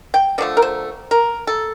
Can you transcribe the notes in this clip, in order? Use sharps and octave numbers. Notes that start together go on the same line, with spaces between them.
G5
D3 F3 A3 D5
A#4
C5
A#4
A4